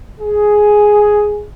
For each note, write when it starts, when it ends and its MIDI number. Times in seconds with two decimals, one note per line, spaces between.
0.20 1.46 68